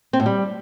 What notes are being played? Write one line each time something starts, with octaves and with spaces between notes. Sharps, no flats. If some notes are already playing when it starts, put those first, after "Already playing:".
C4
A2
G3